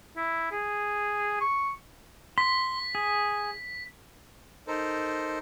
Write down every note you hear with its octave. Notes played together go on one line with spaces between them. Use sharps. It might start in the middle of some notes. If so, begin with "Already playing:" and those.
E4
G#4
C#6
C6 B6
G#4
D#4 A4 A#4 C5